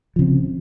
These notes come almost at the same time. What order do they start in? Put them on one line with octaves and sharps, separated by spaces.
F3 C#3 C4